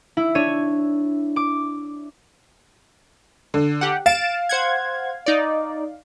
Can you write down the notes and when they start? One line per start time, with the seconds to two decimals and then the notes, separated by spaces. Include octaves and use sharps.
0.17 E4
0.35 D4 C#5 G#6 D#7
1.36 D6
3.54 D3
3.81 G4 F#5
4.06 F5 A6 D7 E7
4.49 C5 F#5 G#6
5.26 D#4 D5